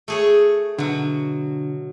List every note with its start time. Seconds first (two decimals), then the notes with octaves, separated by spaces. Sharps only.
0.08 A3 G#4 C#5
0.78 B2 D3 F#3